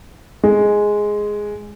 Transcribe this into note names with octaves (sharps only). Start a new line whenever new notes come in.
G#3